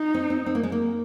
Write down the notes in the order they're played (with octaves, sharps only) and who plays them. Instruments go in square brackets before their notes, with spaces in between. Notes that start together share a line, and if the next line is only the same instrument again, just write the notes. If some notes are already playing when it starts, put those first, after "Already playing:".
Already playing: [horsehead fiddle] D#4
[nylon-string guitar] C4
C4
C4
A#3
G#3
A#3